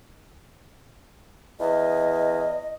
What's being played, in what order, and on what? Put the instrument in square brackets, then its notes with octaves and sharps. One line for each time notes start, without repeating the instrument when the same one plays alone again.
[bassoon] E2 [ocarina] D#5